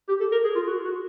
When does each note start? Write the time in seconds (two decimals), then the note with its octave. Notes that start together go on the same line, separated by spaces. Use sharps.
0.08 G4
0.20 A4
0.32 A#4
0.44 G#4
0.55 F4
0.67 F#4
0.85 F#4